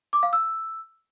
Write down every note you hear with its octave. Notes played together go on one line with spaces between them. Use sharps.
D6
F5
E6